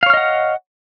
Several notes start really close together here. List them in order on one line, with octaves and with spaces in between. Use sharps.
F5 C#5 F6 D#5 F#5